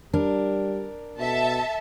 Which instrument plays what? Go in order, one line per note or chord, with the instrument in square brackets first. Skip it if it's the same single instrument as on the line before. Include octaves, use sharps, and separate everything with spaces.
[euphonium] G3 [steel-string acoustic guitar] D4 A#4
[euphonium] B2 [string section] A4 E5 A5